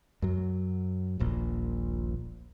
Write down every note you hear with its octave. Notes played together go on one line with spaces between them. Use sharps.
F#2 F#3
D#1 A#1 A#2